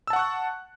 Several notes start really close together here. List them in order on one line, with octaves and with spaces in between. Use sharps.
E6 A5 F#5 C#6 F#6